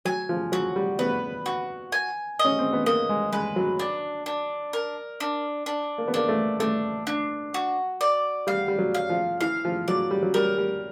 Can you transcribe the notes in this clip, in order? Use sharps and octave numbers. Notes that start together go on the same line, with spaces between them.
F#3 G#5
F3
F#3 F#4
G3
B3 B4
F#4
G#5
D#5
C#4
C4
B3
A#3 D#5
G#3
G#3 B4
F#3
D4
D4
A#4
D4
D4
A#3
B3
A#3 D4
A3
A3 D4
D4
F#4
D5
G3 F5
G3
F#3
F5
F3
E3 F5
F3
F#3 D5
G3
F#3
G3 A#4
G3